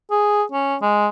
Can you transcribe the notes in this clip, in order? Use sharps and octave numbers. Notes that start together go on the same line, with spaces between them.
G#4
C#4
G#3